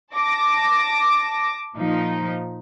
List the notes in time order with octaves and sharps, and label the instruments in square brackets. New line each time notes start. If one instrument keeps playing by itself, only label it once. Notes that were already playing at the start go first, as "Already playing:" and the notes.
[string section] A5 D6 A#6
A#2 F3 D#4